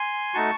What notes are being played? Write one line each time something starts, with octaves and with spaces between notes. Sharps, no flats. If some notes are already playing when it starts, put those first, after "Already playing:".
Already playing: G#5 C6
A3 D#4 F#4 A5 C#6